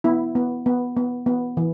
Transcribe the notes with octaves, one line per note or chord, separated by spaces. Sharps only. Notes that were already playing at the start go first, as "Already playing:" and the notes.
B3 E4
B3
B3
B3
B3
E3